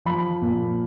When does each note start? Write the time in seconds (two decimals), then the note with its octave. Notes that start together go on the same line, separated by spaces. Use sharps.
0.05 F3 B5
0.42 A#2